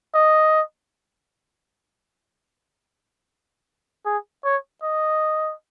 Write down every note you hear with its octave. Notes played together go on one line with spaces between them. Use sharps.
D#5
G#4
C#5
D#5